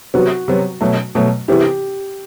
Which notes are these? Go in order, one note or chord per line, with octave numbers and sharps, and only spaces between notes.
C3 F#3 B3 F#4
C3 F#3 B3
B2 F#3 A3
B2 F#3 A3
C3 E3 B3 E4 G4